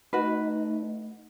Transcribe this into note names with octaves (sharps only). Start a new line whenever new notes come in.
A3 D#4 F#4 B4